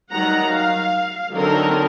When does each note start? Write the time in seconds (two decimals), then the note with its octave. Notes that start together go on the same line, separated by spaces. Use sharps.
0.11 D#3 F#3 G3 F#5 A#5
0.51 F5
1.32 D3 D#3 F#3 C4 A4 A#4